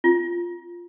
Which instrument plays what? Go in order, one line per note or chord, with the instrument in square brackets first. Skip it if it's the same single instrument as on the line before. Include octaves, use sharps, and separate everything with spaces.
[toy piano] F4